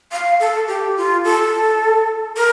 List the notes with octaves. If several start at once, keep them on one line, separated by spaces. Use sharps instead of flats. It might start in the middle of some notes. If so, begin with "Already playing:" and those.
F5
A4
G4
F4
A4
A#4